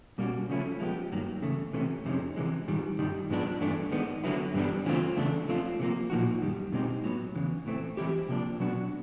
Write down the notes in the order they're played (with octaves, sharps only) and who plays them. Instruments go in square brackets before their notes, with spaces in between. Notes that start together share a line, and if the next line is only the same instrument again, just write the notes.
[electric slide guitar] B2 G3 A#3 C#4 F#4
C#3 F3 A3 C#4 E4
F3 G#3 B3 E4 G4
G2 D#3 F#3 A#3
E2 C#3 A3
C3 E3 A3 C#4
F2 C3 D#3 G#3 C#4
C3 E3 G#3
G#2 D#3 G3
G2 D#3 G3
G#2 F3 G#3 B3 D4
G2 E3 A3 D4
D#3 G#3 B3
D3 F#3 B3 E4
G2 E3 G3 B3 D4
C#3 E3 A3 C4 F4
E2 C#3 A3 D4
F3 A3 C4 F4
C3 F3 A#3
A#2 F3 A#3 D#4 F#4
F#2 D#3 G3
B2 G#3 C4 D#4 G4
A2 F#3 B3
E2 C#3 E3
A2 E3 A3 C4
E3 G#3 C4 E4 G4
C3 F3 A#3 D4
B2 F#3 B3 D4 F#4